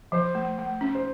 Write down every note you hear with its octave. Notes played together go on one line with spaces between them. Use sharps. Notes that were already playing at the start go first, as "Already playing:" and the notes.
F3 C5
A3
A3
C#4
C5